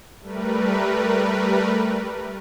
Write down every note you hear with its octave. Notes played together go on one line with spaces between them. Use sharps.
G3 A3 A#4 B4